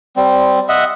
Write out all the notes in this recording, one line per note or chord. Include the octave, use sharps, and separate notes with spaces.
G3 C4
D#5 E5 F#5